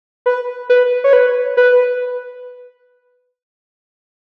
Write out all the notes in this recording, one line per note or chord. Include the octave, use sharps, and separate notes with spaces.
B4
B4
C#5
B4
B4